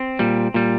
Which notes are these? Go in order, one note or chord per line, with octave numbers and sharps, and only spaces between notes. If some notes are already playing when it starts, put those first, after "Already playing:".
Already playing: C4
A#2 G3
A#2 G3